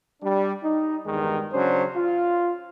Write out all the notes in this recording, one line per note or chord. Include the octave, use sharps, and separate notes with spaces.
G3 D4
D#4
E2 G2 D#3 G#3
C#3 F#3 C#4 D4 C5
F4